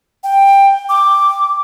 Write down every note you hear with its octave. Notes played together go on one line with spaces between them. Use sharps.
G5
D6